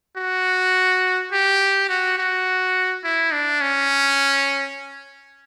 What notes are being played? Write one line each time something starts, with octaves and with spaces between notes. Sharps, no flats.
F#4
G4
F#4
F#4
E4
D4
C#4